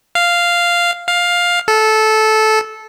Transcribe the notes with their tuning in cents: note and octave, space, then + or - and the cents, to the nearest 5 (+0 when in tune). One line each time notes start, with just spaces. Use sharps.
F5 -5
F5 +10
A4 -15